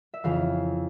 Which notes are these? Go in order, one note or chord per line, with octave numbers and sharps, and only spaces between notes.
E5
F2 C#3 E3 F5